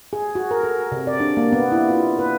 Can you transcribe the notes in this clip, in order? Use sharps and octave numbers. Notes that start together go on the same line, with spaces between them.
G#4
F#4
A#4
A4
C3
D5
D4
A#3
B3
E4
F4
B4